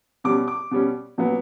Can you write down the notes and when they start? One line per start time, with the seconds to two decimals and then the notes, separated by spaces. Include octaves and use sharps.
0.24 B2 G3 C#4 D6
0.48 D6
0.71 B2 G3 C#4
1.18 A#2 F#3 B3